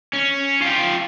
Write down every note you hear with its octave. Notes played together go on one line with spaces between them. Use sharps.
C#4
F4 G4